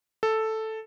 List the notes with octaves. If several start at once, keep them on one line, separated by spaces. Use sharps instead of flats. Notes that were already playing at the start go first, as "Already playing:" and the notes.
A4